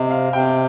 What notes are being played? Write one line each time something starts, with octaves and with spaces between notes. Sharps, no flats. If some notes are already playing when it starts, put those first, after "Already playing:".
Already playing: C3 C5 D#5
F5
C3 G5